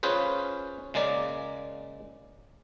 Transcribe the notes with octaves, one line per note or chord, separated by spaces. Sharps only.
C#4 F4 G#4 B4 C5
C#3 G#3 A#3 D5